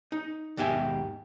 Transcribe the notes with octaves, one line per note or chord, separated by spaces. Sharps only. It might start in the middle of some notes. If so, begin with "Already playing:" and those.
D#4
D#2 G#2 B2 G4 E5 G#5